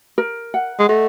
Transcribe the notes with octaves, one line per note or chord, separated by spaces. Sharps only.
A#4
F#5
G#3
A3 D#5